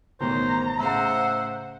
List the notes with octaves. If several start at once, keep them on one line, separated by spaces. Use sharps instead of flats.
A1 B2 D#3 C5 A#5
A2 C#3 C5 E5 F#5